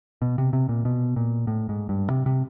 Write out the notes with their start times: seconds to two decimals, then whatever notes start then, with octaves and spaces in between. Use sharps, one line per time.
0.22 B2
0.38 C3
0.53 C3
0.69 A#2
0.85 B2
1.16 A#2
1.47 A2
1.69 G#2
1.89 G2
2.10 C3
2.26 C3